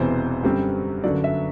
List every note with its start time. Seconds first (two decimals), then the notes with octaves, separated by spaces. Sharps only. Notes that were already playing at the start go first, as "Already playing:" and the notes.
Already playing: E1 E2 C3 E3 C5
0.43 F#2 D3 G3 C4
1.04 G1 F#2 D3 F#3 D5
1.24 E5